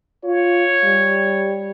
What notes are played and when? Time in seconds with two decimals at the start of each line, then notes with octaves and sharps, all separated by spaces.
0.24 F4 C#5
0.84 G3